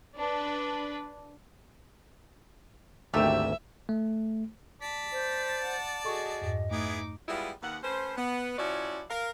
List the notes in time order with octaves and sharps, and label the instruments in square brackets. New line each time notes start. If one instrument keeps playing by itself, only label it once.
[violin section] D4 B4
[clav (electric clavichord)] G#1 D2 A#3 [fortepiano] A3 [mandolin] G4 E6 [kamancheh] E5
[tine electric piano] A3
[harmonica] D5 A5 [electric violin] B6
[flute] C5
[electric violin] F#5
[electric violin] F#4 G#4 [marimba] A4 C#6 [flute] D#5
[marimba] F2 G#2
[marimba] A3 [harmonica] B3 E4 G#4 [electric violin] D#4 D6
[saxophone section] G3 G#3 B3 E4 F4
D#2 B3 F#5
A3 C#4 B4 C5
B3
F3 C#4 E4 F#4 C#5 D5
A#4 F5